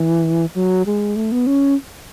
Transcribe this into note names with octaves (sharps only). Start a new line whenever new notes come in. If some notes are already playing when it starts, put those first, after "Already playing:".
Already playing: E3
F#3
G#3
A3
B3
C#4